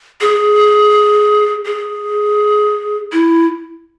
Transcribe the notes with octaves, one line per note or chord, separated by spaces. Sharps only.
G#4
G#4
E4